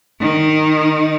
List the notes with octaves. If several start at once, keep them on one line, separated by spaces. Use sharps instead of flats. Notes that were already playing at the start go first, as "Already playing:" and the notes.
D#3 D#4